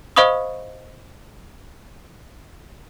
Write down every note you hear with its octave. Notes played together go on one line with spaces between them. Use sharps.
C5 D#5 F5 B5 C#6 D#6